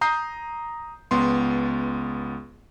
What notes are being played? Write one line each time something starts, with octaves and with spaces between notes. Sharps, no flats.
A#5 D#6 G6 C7
C#2 B3 C6